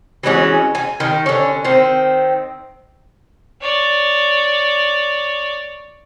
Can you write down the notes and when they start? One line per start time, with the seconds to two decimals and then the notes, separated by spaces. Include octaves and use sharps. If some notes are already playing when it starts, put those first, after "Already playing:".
0.23 E3 F#3 G#3 C#4
0.75 G#5
1.00 D#3
1.26 D3 C#4
1.65 D#3 C4
3.61 C#5 D5